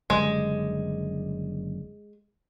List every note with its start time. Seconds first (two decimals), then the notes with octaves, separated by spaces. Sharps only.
0.10 F#1 D3 G3 G#3